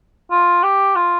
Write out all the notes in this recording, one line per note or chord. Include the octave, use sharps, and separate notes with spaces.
F4
G4
F4